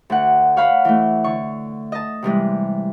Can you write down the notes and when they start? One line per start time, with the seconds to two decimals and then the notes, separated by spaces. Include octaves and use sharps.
0.10 D2 F#5
0.57 C#5 F5 F#5 B5
0.85 E3 A3
1.24 D3 C#6
1.92 D#5 A5
2.23 C3 E3 G3 G#3